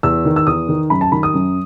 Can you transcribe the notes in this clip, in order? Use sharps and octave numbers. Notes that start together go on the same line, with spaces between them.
E2 E6
D#3
E6
E2 D#6
D#3
F#2 B5
A5
D#3 B5
D#6
F#2